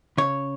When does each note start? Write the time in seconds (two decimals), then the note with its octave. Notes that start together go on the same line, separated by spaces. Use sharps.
0.18 C#3 C#5